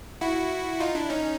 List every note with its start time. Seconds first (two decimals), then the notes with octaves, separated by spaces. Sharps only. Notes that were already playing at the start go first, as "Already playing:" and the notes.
0.21 E4 F#4
0.80 D#4 F4
0.94 D4 E4
1.09 C#4 D#4